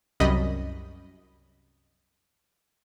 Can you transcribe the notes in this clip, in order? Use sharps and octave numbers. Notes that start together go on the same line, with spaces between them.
C2 F#2 G3 D#5 B5